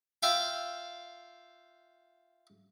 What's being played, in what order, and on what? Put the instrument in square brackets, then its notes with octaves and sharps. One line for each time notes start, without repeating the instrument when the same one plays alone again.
[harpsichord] F4 E5 F5 G5